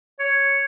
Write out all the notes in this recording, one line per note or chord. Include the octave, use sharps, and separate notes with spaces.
C#5